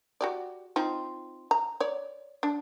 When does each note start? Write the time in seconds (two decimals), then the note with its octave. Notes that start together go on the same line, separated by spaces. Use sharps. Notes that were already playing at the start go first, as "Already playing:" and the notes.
0.21 F#4 G4 D5
0.76 C4 D#4 F4
1.51 A#5
1.80 C#5 D5
2.43 D4